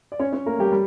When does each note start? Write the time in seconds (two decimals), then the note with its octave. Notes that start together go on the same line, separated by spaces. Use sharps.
0.12 D5
0.19 C#4 C#5
0.33 C#4 C#5
0.46 A3 A#3 A#4
0.59 G3 G4
0.72 G3